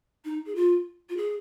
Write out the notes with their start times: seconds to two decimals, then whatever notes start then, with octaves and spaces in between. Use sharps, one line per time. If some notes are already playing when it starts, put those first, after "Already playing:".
0.25 D#4
0.46 G#4
0.55 F4
1.09 F4
1.17 G#4